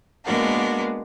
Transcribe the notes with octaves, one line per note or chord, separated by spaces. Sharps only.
G#3 A#3 B3 D4 F#4 A#4